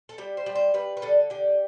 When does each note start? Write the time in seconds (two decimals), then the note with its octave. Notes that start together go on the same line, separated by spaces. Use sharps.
0.09 A4
0.18 G3 G4
0.37 C5
0.46 G3
0.55 C5
0.74 G3 B4
0.97 B4
1.02 D3 A4
1.30 D3 G4